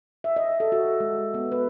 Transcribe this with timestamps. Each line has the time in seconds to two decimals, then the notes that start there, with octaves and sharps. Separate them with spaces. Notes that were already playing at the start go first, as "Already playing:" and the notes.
0.24 E5
0.36 D#5
0.60 A4
0.72 F#4
1.00 G#3
1.34 B3
1.52 B4